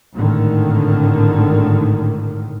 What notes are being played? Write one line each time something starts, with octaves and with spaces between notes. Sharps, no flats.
G#1 A2 D3 D#3